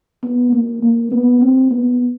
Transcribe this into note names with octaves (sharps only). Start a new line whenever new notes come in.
B3
A#3
A#3
B3
C4
B3